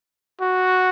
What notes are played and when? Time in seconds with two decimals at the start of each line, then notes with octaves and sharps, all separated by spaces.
0.41 F#4